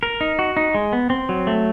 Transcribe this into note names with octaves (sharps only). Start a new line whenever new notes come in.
A#4
D#4
F#4
D#4
G#3
B3
C4
F#3
A3